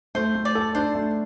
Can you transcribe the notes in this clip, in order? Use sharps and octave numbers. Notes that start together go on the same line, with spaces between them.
A3 C5
A3
D5
A4
D4 C5
A3